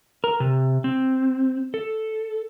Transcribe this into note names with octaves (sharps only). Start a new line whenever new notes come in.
A#4
C3
C4
A4